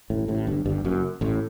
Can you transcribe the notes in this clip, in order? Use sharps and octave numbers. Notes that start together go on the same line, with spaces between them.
A1 A2
A1 A2
G1 G2
G1 G2
F#1 F#2
A1 A2